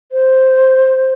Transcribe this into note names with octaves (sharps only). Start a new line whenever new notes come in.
C5